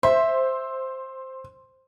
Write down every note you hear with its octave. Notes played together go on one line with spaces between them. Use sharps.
C5 E5